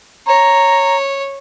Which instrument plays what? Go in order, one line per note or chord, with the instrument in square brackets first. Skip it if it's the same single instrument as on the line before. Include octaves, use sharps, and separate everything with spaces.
[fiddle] C#5 [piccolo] A#5